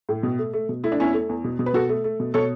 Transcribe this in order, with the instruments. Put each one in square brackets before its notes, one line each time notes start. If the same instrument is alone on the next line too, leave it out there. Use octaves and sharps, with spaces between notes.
[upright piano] A2
B2
A3
A3
B2
A3 E4
D4
E2 C#4 E4
A3
E2
B2
B2
B4
B2 F#4 A4
A3
A3
B2
B2 A4 C#5